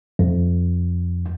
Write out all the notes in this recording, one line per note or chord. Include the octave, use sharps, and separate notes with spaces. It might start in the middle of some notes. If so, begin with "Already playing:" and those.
F2